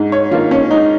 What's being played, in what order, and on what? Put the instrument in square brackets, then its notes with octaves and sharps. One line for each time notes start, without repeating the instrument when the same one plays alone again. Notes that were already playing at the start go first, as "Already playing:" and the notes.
Already playing: [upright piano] G#2
C#5
D#3 A#3 F4
C#4
G#2 D#4